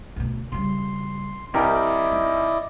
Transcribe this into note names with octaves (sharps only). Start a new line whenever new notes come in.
D2 B2
C#3 G3 C6
C2 D#3 E4 G4 A#4 D5 D#5
D#4